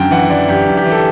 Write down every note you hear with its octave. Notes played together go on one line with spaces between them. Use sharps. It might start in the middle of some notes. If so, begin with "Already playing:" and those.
Already playing: F#2 D3 G5
E3 F#5
E3 D5
F#2 G4
F#2
G4
E3
A4